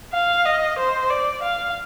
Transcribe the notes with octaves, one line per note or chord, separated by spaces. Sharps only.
F5
D#5
C5
D5
F5